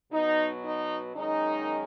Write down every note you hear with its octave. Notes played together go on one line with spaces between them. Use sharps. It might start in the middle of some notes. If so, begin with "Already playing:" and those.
B2 F#3 B3 D#4
D#4
F#2 D#3 G#3 C#4 D#4